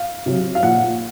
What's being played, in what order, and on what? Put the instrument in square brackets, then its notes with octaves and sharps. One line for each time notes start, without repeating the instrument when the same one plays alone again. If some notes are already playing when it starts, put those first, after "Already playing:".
Already playing: [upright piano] F5
C3 F#3
F5
A#2 F3 F#5